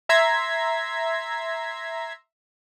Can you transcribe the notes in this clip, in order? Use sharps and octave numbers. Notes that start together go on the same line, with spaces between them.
E5 A#5 C6 G#6 B6